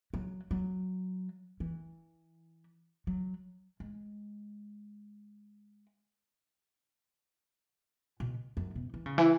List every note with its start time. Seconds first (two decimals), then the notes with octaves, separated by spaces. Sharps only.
0.14 F#3
0.51 F#3
1.60 E3
3.07 F#3
3.80 G#3
8.20 B2
8.57 F#2
8.75 B2
8.94 E3
9.06 C#3
9.18 E3